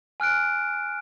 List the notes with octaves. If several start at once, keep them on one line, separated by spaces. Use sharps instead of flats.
G#5 F6 F#6 D7